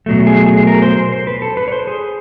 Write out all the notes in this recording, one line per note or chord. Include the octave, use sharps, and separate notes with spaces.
B2 F#3 A3
G#4
G#4
A#4
C5
C5
C5
B4
A4
B4
C#5
C5
G#4